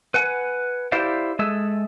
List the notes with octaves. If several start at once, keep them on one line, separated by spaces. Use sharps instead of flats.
B4 F#5 G#5
E4 G4 C5 D5 E5 F5
G#3 G#4 A4 E5